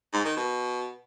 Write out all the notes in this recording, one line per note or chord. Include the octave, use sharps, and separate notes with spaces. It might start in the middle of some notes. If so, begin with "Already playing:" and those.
G#2
D#3
B2